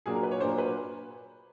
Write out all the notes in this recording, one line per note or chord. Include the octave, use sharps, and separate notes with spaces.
A#2 F#3 A#3 D4 G#4
A#4
B4
C#5
A#2 F#3 A#3 D4 C5
B4